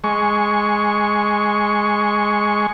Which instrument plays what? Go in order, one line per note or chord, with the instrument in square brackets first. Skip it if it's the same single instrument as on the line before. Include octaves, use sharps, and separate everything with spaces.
[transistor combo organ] G#3 C#6